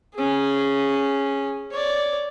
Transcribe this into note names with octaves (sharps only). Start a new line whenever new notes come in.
C#4 G#4
C#5 D5